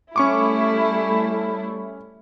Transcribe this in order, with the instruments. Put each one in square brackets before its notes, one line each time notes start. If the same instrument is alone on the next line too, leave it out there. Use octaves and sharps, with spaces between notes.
[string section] G3 A3 E4 [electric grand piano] C#4 C#6 D6